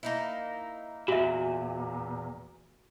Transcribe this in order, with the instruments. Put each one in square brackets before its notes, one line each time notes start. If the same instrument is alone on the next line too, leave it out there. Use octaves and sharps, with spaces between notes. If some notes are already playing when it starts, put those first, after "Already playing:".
[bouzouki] A#3 D#4 E4
[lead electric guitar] E2 A#2 [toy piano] F#4 E5